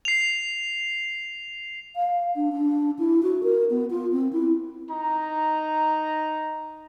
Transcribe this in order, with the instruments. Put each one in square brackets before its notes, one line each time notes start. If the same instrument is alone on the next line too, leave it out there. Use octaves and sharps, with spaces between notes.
[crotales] C7 F7
[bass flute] F5
D4
D4
E4
F#4
A#4
B3
F4
C4
E4
[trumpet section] D#4 A#5